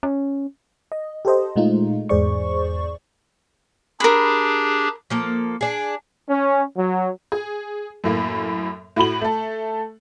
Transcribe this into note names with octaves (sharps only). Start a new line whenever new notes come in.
C#4
D#5
G4 A4 C5 D#5
A#2 G#3 A3 D#4 F4
E2 G#2 G#4 C5 D5 C#6
D4 G4 G#4 A#4 B5
F3 A#3 A4
D4 G#4
C#4
F#3
G#4
F#2 A2 A#3
A2 F#4 B5 F#7
A3 A4